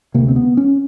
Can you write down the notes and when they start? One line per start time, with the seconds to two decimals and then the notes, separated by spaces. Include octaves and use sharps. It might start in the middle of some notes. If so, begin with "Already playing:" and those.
0.14 D2 C3 A#3
0.28 C4
0.36 B3
0.57 C#4